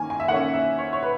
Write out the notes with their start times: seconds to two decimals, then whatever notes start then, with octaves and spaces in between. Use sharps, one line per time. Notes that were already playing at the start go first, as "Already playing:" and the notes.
Already playing: D#3 A#3 C#4 G#5
0.10 G#5
0.20 E5
0.28 D#3 A#3 C#4 F#5
0.54 E5
0.78 C#5
0.93 C#5
1.03 B4